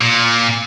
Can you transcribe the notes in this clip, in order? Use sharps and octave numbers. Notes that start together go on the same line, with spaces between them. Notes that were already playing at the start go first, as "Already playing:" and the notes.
A#2